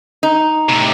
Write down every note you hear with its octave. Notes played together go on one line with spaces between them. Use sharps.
D#4
A2 C3